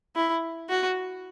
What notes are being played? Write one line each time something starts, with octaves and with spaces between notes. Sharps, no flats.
E4
F#4